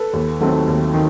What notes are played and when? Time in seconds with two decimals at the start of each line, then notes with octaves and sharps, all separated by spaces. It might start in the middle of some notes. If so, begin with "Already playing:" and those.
Already playing: A4 B4
0.13 D#2
0.41 D#3 F#3 A3 C4
0.67 D#2
0.94 D#3